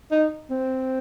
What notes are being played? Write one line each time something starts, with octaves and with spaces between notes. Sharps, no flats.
D#4
C4